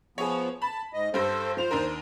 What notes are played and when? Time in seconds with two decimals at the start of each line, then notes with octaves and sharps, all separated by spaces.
0.18 F3 B3 G#4 C#5
0.62 A5 B5
0.93 G#2 D#5
1.14 G2 G4 A4 C5 A#6
1.57 F3 C5 F7
1.71 D#2 D4 A#4